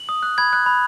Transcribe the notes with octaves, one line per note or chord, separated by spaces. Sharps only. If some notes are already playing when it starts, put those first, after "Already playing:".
Already playing: F#7
D#6
F#6
B5 G#6
F#6
B5